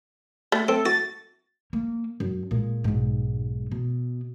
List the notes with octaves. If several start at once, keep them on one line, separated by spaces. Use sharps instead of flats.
A3
C4 A4
F#4 A6
A#3
F#2
A#2 G#3
B1 G#2
B2